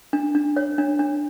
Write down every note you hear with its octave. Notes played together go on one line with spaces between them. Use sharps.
D4
D4
C#5
D4
D4